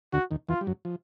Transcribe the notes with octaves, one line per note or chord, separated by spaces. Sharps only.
D2 D3 F#4
D#2 D#3
E2 E3 F4
G3
F#2 F#3
F3